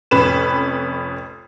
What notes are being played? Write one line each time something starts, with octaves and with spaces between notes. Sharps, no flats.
F1 F2 C#4 B4 E7